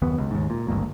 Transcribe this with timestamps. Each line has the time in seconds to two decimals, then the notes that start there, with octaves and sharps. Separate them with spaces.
0.02 F#1 D#2 B3
0.18 C#2
0.31 D#2 G#2
0.50 A#2
0.68 G#1 D2 G2 A#3